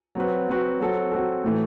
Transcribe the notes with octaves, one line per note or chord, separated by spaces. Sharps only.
F#3 C4 F#4 B4
F#3 C4 F#4 B4
F#3 C4 F#4 A4
F#3 C4 F#4 A4
A2 E3 A3